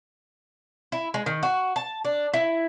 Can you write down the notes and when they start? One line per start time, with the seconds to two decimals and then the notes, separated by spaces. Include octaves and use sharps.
0.92 E4
1.14 G#3
1.26 D#3
1.43 F#4
1.76 A5
2.05 D4
2.34 E4